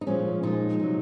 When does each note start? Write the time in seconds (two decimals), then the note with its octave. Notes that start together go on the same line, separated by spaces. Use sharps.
0.01 D#4
0.06 A#2 F3 G#3 C#4
0.43 A#2 F3 G#3 D#4
0.80 C3 F#3